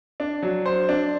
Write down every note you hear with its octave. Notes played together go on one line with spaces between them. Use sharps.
D4
F#3
C5
D4